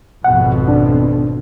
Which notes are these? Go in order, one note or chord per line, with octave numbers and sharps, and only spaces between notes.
G#1 F2 B2 F#5
D4